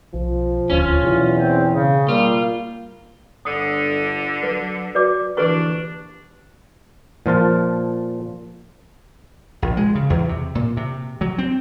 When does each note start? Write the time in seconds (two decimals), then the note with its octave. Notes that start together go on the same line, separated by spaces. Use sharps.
0.14 B1 F3
0.70 D#1 D2 C#4 F4
1.03 E2 B2 F#3
1.36 C4
1.74 C#3
2.09 G3 A#3 F4
3.45 G1 D3 D#6
4.43 F#3 B4
4.95 F#4 B4 D5 D6
5.37 A#1 D3 E3 D4 G4 B4 C#6
7.26 A#2 F3 F4 A5
9.62 A#1
9.77 G#3
9.95 C#3
10.10 E2
10.29 C3
10.55 A#2
10.77 C3
11.21 F#3
11.38 C4